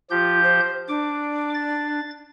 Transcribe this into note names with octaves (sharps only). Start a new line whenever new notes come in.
F3 F4 G4 G6
C5
D4 D6
A6